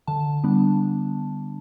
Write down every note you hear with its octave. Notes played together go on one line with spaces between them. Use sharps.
D3 A5
G3 B3 D4